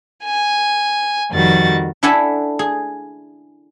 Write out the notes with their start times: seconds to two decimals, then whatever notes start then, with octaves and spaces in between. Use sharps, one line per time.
0.24 G#5
1.31 F2 D#3 G3 F#4 A6
2.03 D4 E4 A4 F#5 G#5 B5
2.59 G#4